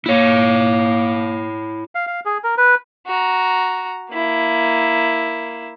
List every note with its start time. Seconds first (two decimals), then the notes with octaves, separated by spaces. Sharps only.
0.06 A#3 E4 C#5
1.95 F5
2.07 F5
2.25 G#4
2.44 A#4
2.58 B4
3.07 F#4 A#5
4.12 A#3 E4